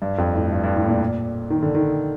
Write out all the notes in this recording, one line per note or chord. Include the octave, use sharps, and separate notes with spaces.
G2
F2
A2
G2
G2
A2
A#2
D#3
D3
D#3